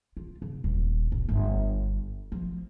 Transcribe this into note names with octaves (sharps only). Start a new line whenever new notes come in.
F4
C#3
D#1
A#1
G1
F3